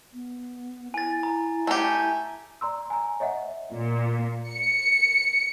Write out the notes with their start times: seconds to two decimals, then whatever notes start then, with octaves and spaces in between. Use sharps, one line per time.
0.13 B3
0.94 E4 G#5 A6
1.23 A#5
1.67 A3 G4 G#5
2.61 D5 A#5 C6 E6
2.90 G#5 A#5
3.20 C#5 D#5 E5 F#5
3.73 A#2
4.51 C#7